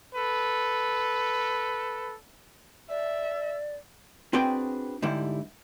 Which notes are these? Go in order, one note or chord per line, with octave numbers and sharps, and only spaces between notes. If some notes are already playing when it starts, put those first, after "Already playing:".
A4 B4
D5 E5
C4 D4 F#4 G#4 B4 G5
G#2 D3 G3 E4